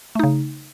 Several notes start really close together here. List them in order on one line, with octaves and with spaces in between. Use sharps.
A3 D#4 C#3